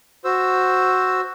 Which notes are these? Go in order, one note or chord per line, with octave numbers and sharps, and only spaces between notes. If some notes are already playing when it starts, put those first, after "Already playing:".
F#4 C5 E6